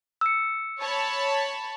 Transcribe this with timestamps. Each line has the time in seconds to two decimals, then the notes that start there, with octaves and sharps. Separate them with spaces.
0.21 E6 C#7
0.81 C#5 A5 B5